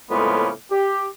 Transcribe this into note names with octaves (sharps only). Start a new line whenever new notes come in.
F2 A2 C#3 G#3 A#3 B3
G4